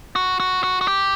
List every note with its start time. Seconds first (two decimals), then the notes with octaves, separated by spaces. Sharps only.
0.16 F#4
0.40 F#4
0.64 F#4
0.81 F#4
0.88 G4